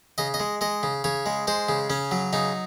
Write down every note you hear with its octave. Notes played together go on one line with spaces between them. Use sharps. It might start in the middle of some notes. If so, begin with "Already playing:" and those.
C#3 D#5
D#5
G#3
G#3 D#5
C#3
C#3 C#5
G#3
G#3 C5
C#3
C#3 C#4
F#3
C#3 D#4